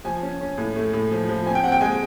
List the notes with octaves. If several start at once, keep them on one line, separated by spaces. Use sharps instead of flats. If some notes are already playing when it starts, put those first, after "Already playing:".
F3 G#5
C#4
C#4
A2
A3
A2
F3
F3
C4 G#5
G5
C4 F#5
G5
G#3 G#5